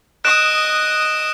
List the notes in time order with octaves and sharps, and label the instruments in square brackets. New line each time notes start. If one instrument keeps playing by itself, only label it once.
[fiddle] D#5 D#6 [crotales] F#6 D7 E7